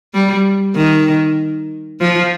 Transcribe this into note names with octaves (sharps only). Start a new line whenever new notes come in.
G3
D#3
F3